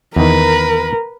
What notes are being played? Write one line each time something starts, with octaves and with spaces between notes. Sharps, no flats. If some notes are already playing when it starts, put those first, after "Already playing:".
E2 D#3 A#4 B4